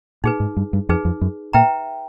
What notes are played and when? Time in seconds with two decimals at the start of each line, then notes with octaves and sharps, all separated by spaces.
0.24 A#2 D#4 G#4 B4
0.40 G#2
0.57 G2
0.73 G2
0.89 F2 D#4 G#4 B4
1.05 F2
1.21 F#2
1.53 A#2 B4 E5 G5 A#5